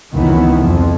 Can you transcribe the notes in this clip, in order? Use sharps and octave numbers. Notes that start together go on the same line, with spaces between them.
F1 C#2 D#3 E3 B3
F2